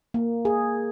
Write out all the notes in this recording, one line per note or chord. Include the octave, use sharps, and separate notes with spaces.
A#3
G#4